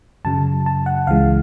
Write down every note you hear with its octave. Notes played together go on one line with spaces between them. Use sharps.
F#2 C#3 F#3 A5
A5
F#5
C#2 C#3 E3 G#3 F5